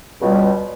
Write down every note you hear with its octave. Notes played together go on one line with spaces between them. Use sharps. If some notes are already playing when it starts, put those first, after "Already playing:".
C#2 B2 G3